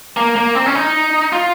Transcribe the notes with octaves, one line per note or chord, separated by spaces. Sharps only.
A#3
A#3
C4
C#4
D#4
F4